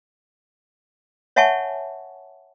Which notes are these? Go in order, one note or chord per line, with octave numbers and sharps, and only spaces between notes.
C#5 E5 F#5 G#5 A5 C#6